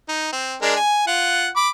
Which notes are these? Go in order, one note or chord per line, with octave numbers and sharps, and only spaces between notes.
D#4
C4
G#3 D4 A#4
G#5
F4 F#5
B5 D6